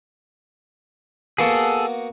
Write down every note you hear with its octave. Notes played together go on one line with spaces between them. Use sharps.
A#3 B3 F#4 G#4 A4